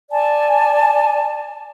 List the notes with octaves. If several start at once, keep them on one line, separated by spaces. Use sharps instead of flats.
D5 G#5 A5